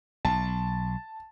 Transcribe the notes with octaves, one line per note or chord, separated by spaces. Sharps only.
B1 A5